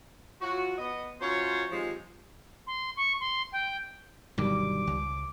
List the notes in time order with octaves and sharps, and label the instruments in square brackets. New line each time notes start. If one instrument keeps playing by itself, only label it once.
[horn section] F#3 F4 F#4
B3 D#5
F#2 F4 C5 C#5
C3 D#3 F3 G#3
[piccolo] C6
C#6
C6
G5
[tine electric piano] G1 D#3 G3 [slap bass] G2 B2 F#3 [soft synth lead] D6
[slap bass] C#2